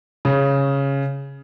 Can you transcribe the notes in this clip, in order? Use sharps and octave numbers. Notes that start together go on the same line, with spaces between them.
C#3